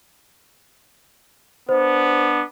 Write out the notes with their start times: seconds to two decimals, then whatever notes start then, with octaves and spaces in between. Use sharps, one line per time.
1.69 B3 D4 C5